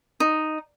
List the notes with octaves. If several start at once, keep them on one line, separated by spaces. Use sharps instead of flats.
D#4